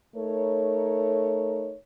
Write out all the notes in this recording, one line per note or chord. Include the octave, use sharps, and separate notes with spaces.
A3 D#4 A4 A#4 C#5